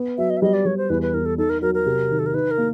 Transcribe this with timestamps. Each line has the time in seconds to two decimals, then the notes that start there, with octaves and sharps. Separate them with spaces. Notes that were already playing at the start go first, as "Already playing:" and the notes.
Already playing: B3
0.18 F#3 E5
0.30 D#5
0.37 E5
0.42 G3 D#5
0.53 D5
0.65 G3 C#5
0.77 C5
0.90 E2 B4
1.02 B4
1.14 E2 A#4
1.26 A4
1.38 D#4 A4
1.50 A#4
1.62 F#3 A#4
1.74 A#4
1.86 C3
2.11 D#3
2.19 A4
2.26 A#4
2.34 D#4 B4
2.51 A#4
2.58 A#3